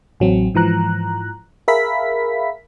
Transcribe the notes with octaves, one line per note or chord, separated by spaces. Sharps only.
A1 F#3 C4
G#2 E3 F3 A#5 F#6
G#4 A#4 E5 F5 B5 B6